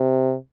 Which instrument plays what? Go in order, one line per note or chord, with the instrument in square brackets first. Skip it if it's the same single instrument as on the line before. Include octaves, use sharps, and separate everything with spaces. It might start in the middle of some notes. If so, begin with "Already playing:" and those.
Already playing: [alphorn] C3